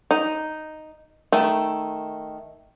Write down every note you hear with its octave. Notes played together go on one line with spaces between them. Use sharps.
D#4
D#3 A3